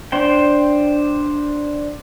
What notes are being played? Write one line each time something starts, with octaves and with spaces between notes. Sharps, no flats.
D4 C5 G5